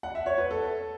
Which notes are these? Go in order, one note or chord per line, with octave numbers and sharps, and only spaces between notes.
F#5
E5
C#5
B4
A4